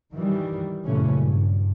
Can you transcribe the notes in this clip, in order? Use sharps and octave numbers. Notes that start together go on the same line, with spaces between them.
D#3 E3 G3
F#2 A#2 C#3 E3 A3 C#4
G2